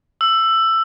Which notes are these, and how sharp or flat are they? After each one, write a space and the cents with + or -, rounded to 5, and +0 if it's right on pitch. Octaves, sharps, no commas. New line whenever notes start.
E6 +15